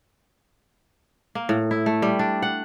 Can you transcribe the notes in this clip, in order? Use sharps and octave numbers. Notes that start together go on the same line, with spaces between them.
A#3
A2
E4
A3
G3
D4
F#5